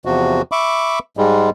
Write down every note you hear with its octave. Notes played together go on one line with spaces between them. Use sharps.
E2 C3 F3 F#4
E5 B5 C#6 D6
G#2 G3 G#3